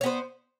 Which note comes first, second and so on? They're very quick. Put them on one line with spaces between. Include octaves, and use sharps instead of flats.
C#5 B3 C5